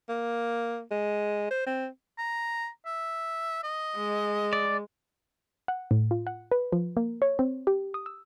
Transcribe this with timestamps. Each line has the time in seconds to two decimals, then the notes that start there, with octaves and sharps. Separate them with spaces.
0.09 A#3
0.91 G#3
1.51 C5
1.67 C4
2.18 A#5
2.86 E5
3.63 D#5
3.96 G#3
4.53 D5
5.68 F#5
5.91 A2
6.11 F4
6.27 F#5
6.52 B4
6.72 F3
6.97 A#3
7.22 C#5
7.39 C4
7.67 G4
7.94 D#6
8.06 E6